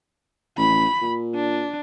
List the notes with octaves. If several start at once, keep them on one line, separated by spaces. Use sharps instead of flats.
A1 B5
A#2
D4